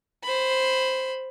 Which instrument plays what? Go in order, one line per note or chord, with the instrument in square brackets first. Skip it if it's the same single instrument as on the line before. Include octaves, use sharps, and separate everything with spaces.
[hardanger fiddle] C5 B5